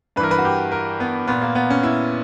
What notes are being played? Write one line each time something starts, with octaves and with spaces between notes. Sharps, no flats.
G2 E3 A#4 B4
B4
F#4
G4
A#4
B3
A#2 B3
A#3
B3
C#4
E4